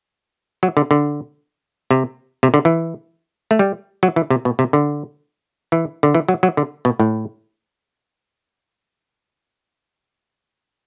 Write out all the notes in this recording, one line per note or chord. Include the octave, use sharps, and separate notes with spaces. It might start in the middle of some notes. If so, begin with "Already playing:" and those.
F#3
D3
D3
C3
C3
D3
E3
A3
G3
F#3
E3
C3
B2
C3
D3
E3
D3
E3
F#3
F#3
D3
B2
A2